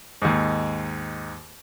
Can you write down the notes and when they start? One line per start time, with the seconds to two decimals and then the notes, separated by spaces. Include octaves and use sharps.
0.22 D#2 G#2